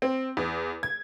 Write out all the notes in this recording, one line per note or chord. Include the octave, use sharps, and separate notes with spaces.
C4
E2
G#6